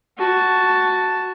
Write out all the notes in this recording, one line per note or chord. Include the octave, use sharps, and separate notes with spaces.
F#4 A5